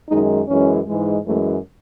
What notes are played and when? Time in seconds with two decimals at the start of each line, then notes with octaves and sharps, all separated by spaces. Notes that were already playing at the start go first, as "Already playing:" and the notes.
0.10 F#2 D#3 G#3 D#4
0.48 F#2 E3 G#3 C#4
0.87 G#2 E3 G#3
1.26 F#2 E3 G#3 A3